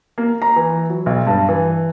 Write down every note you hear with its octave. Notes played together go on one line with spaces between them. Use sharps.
A#3
A#5
E3
F#3
B1
G2
E3